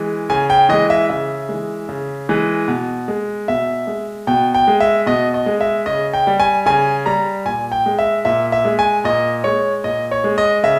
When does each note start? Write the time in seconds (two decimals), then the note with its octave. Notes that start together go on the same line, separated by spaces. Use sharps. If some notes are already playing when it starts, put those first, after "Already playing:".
Already playing: E3 G#3
0.29 C#3 G#5
0.50 G5
0.69 E3 G#3 D#5
0.90 E5
1.10 C#3 E5
1.49 E3 G#3
1.89 C#3
2.29 E3 G#3
2.68 B2
3.08 G#3
3.48 B2 E5
3.87 G#3
4.27 B2 G5
4.55 G5
4.68 G#3
4.80 E5
5.06 B2 D#5
5.34 D#5
5.46 G#3
5.61 E5
5.86 C#3 D#5
6.14 G5
6.27 G3
6.40 G#5
6.66 C#3 G#5
7.06 G3 A#5
7.45 A#2 G#5
7.72 G5
7.86 G#3
7.99 E5
8.25 A#2 E5
8.52 E5
8.65 G#3
8.79 G#5
9.04 A#2 D#5
9.44 G#3 C#5
9.84 A#2 D#5
10.11 C#5
10.24 G#3
10.38 D#5
10.63 C#3 E5